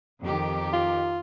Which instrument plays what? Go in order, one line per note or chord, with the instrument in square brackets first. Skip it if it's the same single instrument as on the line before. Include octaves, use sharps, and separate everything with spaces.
[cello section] F2 D#3 G4
[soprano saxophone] F4